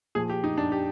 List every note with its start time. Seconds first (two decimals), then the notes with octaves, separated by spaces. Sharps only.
0.15 A#2 F3 G#4
0.30 G4
0.44 D#4
0.57 D4
0.72 G4